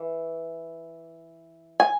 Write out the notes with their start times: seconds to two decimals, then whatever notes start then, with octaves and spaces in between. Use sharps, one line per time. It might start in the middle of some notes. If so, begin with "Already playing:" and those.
Already playing: E3
1.80 G#5